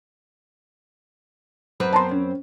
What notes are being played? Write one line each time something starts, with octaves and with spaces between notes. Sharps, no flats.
F#2 C4 B4
A5 A#5 C6
C#4